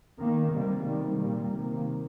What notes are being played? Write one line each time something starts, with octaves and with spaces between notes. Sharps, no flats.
D#3 A#3
C3 G3 A#3
C3 D#3 G3
A#2 G3 A#3
C3 D#3 A#3